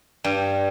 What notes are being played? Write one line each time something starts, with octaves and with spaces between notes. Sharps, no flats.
G2